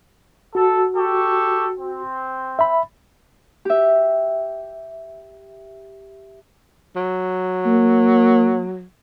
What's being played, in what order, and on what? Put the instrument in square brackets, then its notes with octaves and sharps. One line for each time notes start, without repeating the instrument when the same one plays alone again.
[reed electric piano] F#4 [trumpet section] A4
[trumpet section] G4 A4 C#6
C4
[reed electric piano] E5 B5
[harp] G4 E5
[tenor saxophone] F#3
[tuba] A#3